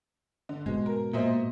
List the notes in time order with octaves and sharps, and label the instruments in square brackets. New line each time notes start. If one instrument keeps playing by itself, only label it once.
[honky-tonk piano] D3
[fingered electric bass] G#2 B2 [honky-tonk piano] G#3
[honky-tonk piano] A#4
[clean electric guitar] A#2 [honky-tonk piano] C5 D#5 E5